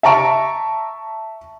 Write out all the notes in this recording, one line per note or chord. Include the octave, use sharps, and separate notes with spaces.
E5 A5 A#5 C#6 D7